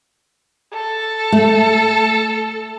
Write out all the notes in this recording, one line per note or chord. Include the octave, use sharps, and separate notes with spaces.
A4
A3